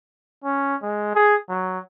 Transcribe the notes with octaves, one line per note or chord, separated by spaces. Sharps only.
C#4
G#3
G#4
F#3